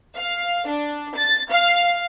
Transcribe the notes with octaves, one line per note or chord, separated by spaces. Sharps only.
F5
D4
A6
F5